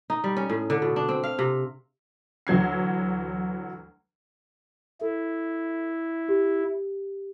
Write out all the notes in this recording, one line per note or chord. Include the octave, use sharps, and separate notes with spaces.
D#4
G3
C#4
A2
D3
B2
D4
C4
F5
C3
D2 E3 F#3 G#6 C7
E4 A4
G4